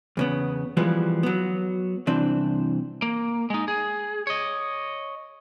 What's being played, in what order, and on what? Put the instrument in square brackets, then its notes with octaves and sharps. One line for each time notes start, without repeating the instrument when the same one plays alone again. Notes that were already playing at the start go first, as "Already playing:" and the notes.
[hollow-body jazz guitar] E2 C#3 B3
E3 F3 G3 G#3 B3
F#3 B3
C2 E3 C4 D4
[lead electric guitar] A#3
G#3 D#4
G#4
C#5 D#5